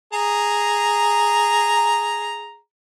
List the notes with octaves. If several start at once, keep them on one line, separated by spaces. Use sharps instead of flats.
G#4 A#5